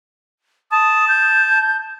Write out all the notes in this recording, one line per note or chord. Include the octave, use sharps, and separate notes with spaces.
A5 D#6
G6